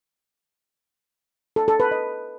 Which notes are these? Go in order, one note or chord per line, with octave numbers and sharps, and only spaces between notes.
A4
A4
B4
D#5